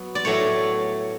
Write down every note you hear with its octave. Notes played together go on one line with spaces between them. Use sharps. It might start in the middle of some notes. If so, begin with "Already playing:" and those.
Already playing: F#3 B3
D5
A2 F#3 A3 C#5